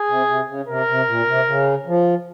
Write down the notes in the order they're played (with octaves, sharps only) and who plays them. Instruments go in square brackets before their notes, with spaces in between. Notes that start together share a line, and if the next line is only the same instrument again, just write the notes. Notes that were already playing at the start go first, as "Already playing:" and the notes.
Already playing: [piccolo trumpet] G#4
[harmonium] C3
C3
C#3
[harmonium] C3 [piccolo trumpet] A#4
[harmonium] C3
A#2
C3
C#3
F3